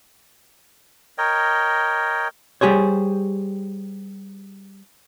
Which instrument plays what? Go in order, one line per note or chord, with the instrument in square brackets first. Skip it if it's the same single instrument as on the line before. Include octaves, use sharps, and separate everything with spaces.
[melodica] A#4 C#5 D#5 G5
[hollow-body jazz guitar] G3 G4 G#4 C5 C#5